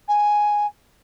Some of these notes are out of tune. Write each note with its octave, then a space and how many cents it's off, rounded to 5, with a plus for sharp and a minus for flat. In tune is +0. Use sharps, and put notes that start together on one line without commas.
G#5 +0